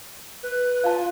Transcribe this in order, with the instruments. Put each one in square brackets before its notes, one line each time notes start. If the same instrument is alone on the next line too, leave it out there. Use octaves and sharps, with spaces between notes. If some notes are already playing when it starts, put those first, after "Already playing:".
[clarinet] B4 [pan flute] F#6
[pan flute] F4 [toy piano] F5 A5